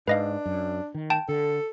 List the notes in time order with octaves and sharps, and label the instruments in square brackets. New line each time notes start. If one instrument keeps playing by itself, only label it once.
[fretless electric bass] G#2 [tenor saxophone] D4 [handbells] B4 D#5 F5
[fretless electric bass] F#2
D#3
[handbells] G5 A5
[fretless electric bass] D3 [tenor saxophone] A4